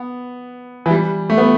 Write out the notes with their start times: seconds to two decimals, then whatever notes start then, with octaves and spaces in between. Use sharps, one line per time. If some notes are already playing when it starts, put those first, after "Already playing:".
Already playing: B3
0.86 E3
0.91 G3
1.30 A3
1.38 B3